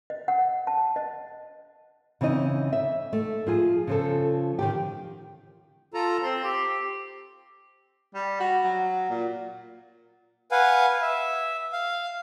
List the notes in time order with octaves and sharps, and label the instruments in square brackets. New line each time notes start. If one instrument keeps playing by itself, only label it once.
[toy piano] D#5
F#5
A5
D#5
[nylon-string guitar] C#3 E3 C4 D#4 D#5
E5
A3
F3 F4 G#4
C#3 F3 A4
D#3 F3 G4
[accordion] F4 A4 A#5
[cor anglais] C4 [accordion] C6
[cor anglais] G4
[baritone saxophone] G3
F#4
F#3
A#2
[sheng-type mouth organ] B4 F5 F#5 G#5
E5
F5